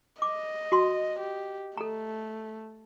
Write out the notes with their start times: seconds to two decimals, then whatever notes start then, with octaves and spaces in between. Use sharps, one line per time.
0.22 D#5 D6
0.72 F#4 C6
1.20 G4
1.77 A3 A4 A#5